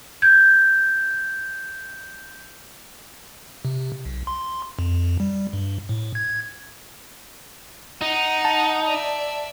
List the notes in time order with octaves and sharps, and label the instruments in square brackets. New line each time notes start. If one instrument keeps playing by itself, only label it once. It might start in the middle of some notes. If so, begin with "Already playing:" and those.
[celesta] G6 G#6
[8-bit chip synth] C3
B1
C6
F2
G3
G2
A2
G#6
[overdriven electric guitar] D#4 [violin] F#5
[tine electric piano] A5
[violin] D5 E5